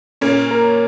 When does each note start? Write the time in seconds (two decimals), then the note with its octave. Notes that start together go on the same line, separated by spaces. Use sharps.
0.21 A#2 A#3 C#4
0.51 A#4